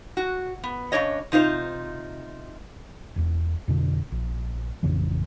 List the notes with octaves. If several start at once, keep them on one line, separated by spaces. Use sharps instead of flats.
F#4
B3
C#3 F#3 D4 C#5 D#5
C3 D#4 F4 C5
E1 E2
F2 B2 D3
A#1
A1 F2 C#3 E3